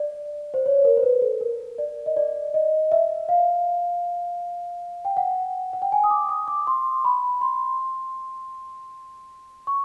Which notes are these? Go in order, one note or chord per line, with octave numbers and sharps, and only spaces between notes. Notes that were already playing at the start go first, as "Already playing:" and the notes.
Already playing: D5
C5
C#5
A#4
C5
B4
A4
A#4
D5
D#5
D5
D#5
E5
F5
G5
F#5
F#5
G5
G#5
D#6
D6
D#6
D6
C6
B5
C6
C#6